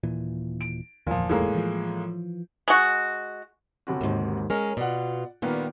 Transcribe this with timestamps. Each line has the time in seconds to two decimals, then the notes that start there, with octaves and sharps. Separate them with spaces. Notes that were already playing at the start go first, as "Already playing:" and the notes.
0.04 D#1 A#2 E3
0.61 D7
1.07 D1 G1 E2 A#2 F3
1.29 A2 G#3 A#3
1.55 E3 F3
2.68 G#3 F#4
3.87 G1 C3 F#4
4.01 D#2 G#2
4.50 G#3 C#4 A#4
4.77 B2 F4 D5 F#5
5.42 A#2 D#3 G3 A#3 B3